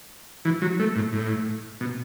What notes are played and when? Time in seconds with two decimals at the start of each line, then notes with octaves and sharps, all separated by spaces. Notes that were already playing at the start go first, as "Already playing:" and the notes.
0.45 E3
0.62 F#3
0.79 A3
0.96 A2
1.13 A2
1.81 B2